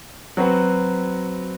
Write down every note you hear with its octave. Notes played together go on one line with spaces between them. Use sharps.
F#3 C4 F#4 B4